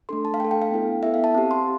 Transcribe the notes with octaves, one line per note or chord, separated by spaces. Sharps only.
A3 D4 A4 C6
A5
F5
A3 D4 A4 G5
G5
F5
B3 E4 A4
B3 E4 A4 E5
F5
A5
C4 G4
C6